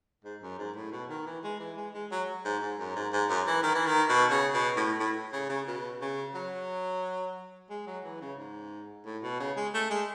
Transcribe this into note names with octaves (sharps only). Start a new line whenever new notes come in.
G#2
F#2
G#2
A2
B2
D#3
E3
G#3
E3
G#3
G#3
F#3
G#2
G#2
F#2
G#2
G#2
F#2
E3
D#3
E3
D#3
B2
C#3
B2
A2
A2
C#3
C#3
B2
C#3
F#3
G#3
F#3
E3
C#3
G#2
A2
B2
C#3
G#3
A3
G#3